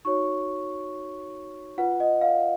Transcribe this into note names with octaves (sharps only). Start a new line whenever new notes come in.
D#4 F#4 C#5 C#6
F4 B4 F#5
D#5
F5